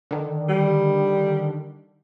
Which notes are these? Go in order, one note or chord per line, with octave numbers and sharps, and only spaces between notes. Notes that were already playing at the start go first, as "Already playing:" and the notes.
D3 D#3
G3